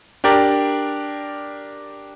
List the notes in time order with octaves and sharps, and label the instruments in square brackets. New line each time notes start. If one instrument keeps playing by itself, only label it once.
[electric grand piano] D4 G4 A#4 D5